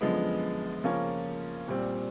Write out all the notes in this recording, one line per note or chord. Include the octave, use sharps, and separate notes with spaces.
F#2 D3 F3 G#3 B3
C#3 F3 A#3 C#4 F4
A#2 G3 C4